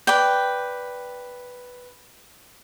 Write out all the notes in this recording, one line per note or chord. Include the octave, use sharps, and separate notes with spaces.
B4 D5 G5